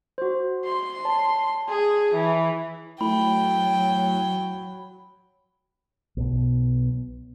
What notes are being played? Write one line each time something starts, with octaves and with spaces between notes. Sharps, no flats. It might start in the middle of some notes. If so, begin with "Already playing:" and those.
F#4 C5
C6
C#5 A5
G#4
E3
F#3 A3 E4 G5 B5
B1 B2